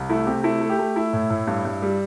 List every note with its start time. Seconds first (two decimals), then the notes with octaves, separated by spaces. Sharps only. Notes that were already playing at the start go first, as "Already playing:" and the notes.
Already playing: C2
0.10 A3 E4
0.27 C3 G4
0.44 A3 E4
0.61 A3
0.70 G4
0.79 A3
0.96 A3 E4
1.13 A2
1.30 A2
1.47 G2
1.65 G2
1.82 G3